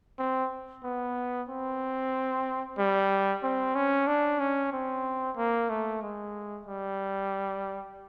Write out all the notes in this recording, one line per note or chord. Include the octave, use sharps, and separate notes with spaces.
C4
B3
C4
G3
C4
C#4
D4
C#4
C4
A#3
A3
G#3
G3